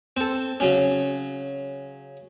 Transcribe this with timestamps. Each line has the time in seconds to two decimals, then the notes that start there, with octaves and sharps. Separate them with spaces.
0.17 C4 A4
0.60 C#3 F#3 C#4